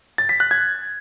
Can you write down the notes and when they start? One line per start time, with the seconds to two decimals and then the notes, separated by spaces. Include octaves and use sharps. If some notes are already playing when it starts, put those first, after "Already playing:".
0.18 A6
0.29 B6
0.40 F#6
0.51 G#6